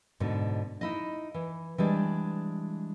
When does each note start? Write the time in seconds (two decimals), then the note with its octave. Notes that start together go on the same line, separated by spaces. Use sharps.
0.20 G#2 B2 D3
0.81 D#4 E4 D#5
1.34 E3
1.78 E3 G3 G#3 D4